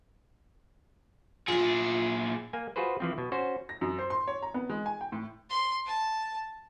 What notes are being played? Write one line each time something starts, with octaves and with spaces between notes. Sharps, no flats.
A#2 E4 F4 G#4
A#3 G#5
F4 F#4 G#4 B4 C5
E3 F3 C4
B2
C#4 F#4 C5
A#6
F#2
C5
C6
C#5
A#5
B3
G#3
G#5
G5
A2
C6
A5